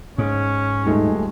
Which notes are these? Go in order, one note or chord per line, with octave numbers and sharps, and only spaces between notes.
G#2 C#4
D#1 G#3 A3 D#4